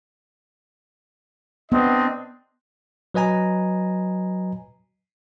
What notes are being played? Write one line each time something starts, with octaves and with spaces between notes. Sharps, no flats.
B3 C4 D4 D#5
F#3 B4 D#5 G#5 A#5